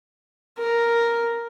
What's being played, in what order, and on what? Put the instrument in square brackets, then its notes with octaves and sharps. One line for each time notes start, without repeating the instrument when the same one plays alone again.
[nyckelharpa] A#4